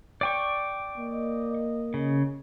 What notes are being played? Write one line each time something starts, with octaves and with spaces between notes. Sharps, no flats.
D5 G5 C#6
A#3 D#5
C#3